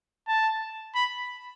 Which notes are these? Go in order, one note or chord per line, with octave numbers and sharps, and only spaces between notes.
A5
B5